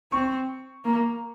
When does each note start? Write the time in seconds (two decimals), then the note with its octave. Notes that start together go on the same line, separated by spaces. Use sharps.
0.12 C4 C#6
0.85 A#3